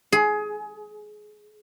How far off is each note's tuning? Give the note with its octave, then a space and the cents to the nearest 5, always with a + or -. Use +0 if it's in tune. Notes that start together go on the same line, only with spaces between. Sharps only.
G#4 +20